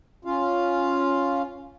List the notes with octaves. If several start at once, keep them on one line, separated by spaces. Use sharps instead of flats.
C#4 F4 F5